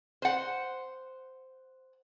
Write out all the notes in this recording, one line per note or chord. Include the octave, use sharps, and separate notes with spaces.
C5 F#5